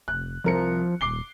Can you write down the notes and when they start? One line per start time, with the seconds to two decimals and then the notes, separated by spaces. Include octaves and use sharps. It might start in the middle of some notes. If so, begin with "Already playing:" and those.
0.08 F1 F#6
0.44 C2 F3 A#4 C#7
1.01 D#1 D6 C7 G7